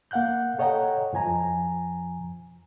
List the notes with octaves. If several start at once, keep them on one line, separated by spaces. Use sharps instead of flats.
A#3 F5 F#5 F#6 G6
A4 C#5 D#5 F#5 G5 A#5
F2 F3 G#5 A#5